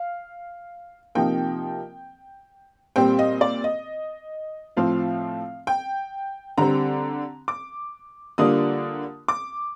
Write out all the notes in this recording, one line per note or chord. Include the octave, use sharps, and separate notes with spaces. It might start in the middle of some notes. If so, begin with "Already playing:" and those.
Already playing: F5
C3 F3 A#3 D#4 G5
A#2 G3 C4 G5
D#5
D5
D#5
A2 F3 C4 F4 F5
G5
D3 G3 C4 A#5
D6
D3 G3 A#3 D4 F4 D#6
D6